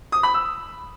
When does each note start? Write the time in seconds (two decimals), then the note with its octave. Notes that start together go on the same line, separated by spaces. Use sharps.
0.12 D#6
0.23 B5
0.34 E6